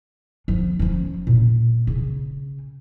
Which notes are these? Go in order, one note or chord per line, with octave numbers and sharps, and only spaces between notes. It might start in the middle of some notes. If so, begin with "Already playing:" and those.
F3
F3 C#4
A#2
C#3